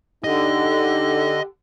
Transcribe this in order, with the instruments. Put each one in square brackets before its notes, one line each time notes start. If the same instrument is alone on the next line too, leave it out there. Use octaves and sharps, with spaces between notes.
[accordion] D3 [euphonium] D#4 [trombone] G4 [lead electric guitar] D#5